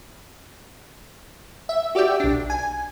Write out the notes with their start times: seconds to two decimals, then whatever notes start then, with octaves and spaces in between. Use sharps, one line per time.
1.69 E5
1.95 F#4 G4 D5 E5 G5
2.20 B1 D4
2.50 G#5